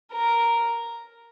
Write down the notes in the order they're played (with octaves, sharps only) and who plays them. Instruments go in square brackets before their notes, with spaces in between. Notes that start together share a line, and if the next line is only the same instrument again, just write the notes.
[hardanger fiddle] A#4